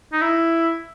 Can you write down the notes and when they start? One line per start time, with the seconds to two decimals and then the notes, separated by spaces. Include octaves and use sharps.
0.13 D#4
0.22 E4